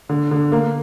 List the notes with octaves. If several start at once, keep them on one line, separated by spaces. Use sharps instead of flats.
D3
D3
A#3